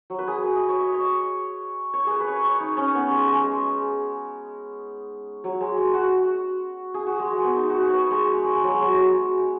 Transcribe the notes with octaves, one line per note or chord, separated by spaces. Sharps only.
F#3
B4
G#4
B4
D#5
C#5
D#5
C#5
C#5
G#4 B4
B4
C#5
C#5
D#4
C#4
B3
G#3
G#3
G#3
F#3
G#3
G#3
F#4
G#4
F#4
G#3
G#3
B3
D#4
F#4
G#4
B4 C#5
G#3
G#3
G#3
G#3
F#3
G#3
F#3
G#3